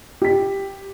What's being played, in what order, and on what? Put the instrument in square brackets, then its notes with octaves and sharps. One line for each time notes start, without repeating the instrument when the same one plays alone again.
[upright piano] G4 B6